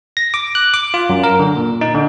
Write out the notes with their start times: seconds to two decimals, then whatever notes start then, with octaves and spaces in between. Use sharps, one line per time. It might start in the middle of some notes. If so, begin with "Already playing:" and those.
0.17 A#6
0.34 D6
0.55 F#6
0.74 D6
0.94 F4
1.10 F#2
1.23 A#4
1.39 D3
1.57 A#2
1.81 D#4
1.94 D3